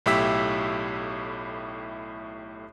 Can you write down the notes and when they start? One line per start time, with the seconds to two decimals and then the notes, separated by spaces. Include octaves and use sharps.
0.06 B1 A2 E4 G4 E6 B6